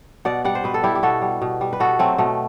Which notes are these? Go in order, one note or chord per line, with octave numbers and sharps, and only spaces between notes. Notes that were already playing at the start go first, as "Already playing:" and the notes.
B2 D5 F#5
G3 D5 F#5
C5
B2 B4
A4
G3 E4 G4
G4
B2 F#4 A4
G3
B2
G3
B4
B2 F#4 A4
F#3 A3 C4
B2 A3